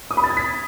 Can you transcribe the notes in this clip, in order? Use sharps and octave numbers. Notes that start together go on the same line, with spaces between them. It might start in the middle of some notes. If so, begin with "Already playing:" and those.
D#6
B5
A6
G#6
B6